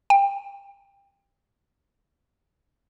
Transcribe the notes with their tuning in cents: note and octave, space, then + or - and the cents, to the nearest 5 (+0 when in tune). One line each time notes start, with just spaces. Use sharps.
G5 +25